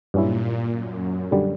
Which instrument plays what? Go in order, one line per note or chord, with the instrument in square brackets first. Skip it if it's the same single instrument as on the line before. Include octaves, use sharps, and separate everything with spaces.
[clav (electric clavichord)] G2 F#3 C#4 E4 [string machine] A#2
[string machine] F#2
[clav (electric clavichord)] F#2 D3 G3